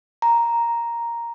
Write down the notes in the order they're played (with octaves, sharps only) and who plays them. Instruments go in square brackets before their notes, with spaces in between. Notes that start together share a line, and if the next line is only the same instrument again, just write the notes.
[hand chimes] A#5